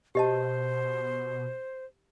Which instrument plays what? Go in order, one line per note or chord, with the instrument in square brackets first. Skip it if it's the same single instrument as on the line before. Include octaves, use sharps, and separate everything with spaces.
[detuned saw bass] B2 [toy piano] G4 D#5 A5 [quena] C5